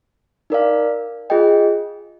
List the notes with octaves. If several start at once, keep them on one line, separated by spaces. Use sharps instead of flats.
D#4 A#4 D5 F5
F4 G#4 D#5 G5